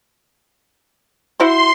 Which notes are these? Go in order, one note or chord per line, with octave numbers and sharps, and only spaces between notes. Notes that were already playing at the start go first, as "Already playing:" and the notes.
E4 F#4 C5 C6